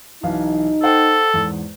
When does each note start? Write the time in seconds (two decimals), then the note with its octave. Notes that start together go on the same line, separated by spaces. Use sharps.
0.23 B1 E3 D#4 F5
0.83 A4 C5 F#5 G5
1.34 E2 G#2